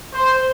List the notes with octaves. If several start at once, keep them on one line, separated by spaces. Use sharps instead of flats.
C5